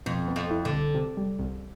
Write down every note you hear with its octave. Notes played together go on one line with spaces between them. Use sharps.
F2 B2
B3
F2
E4
D3
C2
C3
G3
C2